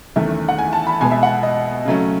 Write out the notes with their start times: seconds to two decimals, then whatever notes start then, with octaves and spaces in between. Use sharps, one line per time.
0.16 E2 D#3 A3 C#4 E5
0.49 F#5
0.58 G#5
0.73 A5
0.87 B5
1.00 B2 G#3 B3 G#5
1.11 E5
1.23 F#5
1.43 D#5
1.85 C#3 F#3 A3 C#4